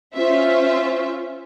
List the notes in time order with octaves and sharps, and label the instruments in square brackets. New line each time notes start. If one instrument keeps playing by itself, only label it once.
[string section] C#4 F4 C5 E5